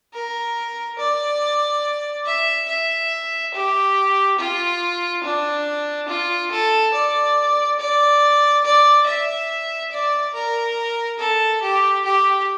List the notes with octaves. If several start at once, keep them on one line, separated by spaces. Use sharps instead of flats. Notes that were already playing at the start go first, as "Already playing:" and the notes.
A#4
D5
E5
E5
G4
F4
D4
F4
A4
D5
D5
D5
E5
D5
A#4
A4
G4
G4